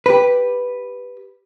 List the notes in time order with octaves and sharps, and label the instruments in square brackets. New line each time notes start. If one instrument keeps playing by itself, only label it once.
[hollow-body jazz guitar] G4 B4